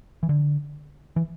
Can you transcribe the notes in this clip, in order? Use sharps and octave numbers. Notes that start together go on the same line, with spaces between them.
E3
D3
E3